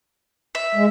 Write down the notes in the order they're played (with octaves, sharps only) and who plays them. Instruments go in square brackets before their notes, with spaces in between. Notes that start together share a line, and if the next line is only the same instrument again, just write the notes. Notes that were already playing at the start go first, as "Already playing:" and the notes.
[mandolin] E5
[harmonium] G#3